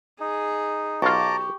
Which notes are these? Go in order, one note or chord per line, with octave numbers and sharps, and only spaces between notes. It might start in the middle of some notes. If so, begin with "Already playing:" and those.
D#4 G#4
B1 F4 G4 A5 A#5 C#6 D6